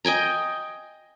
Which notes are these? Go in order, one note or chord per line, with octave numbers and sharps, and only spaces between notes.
D#5 G5 G#5 A#5